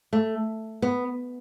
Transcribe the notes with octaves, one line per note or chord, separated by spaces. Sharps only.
A3
B3